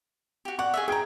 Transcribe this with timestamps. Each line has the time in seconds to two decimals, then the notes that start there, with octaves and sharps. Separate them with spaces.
0.45 F#4 G4
0.59 D5 F#5 C#6
0.74 G#4 D#5 E5
0.88 G#4 G5 A#5 G#6 D7